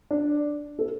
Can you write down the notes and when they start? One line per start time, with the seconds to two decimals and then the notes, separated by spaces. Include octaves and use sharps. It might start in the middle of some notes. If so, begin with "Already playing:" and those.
0.11 D4
0.79 A4